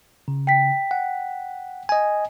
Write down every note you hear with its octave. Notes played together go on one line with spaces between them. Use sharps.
C#3
G5 B6
F#5
D#5 G#5